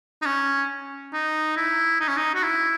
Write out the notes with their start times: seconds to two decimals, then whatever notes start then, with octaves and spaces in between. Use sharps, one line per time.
0.22 D#4
0.26 C#4
1.13 D#4
1.56 E4
2.00 D#4
2.08 C#4
2.17 D#4
2.35 F#4
2.43 E4